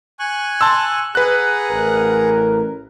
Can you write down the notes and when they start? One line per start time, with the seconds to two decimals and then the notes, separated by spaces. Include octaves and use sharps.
0.19 G#5 C#6 F#6
0.61 A5 C6 E6
1.15 G#4 B4 F#5 A#5 F#6
1.69 A1 A#4